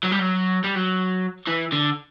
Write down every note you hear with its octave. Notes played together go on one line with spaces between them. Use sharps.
F#3
G3
F#3
G3
F#3
E3
D3